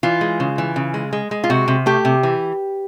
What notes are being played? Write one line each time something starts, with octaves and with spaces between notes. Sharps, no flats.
E3 F4
G#3
C#3
E3
C#3
G#3
G#3
G#3
F4
C3 F#4
C3
A3 G4
C3
E3